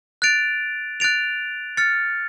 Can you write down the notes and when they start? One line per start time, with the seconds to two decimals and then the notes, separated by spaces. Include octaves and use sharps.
0.22 F#6 A6 D7 F7
1.00 F#6 A6 D7 F7
1.77 F6 A6 C#7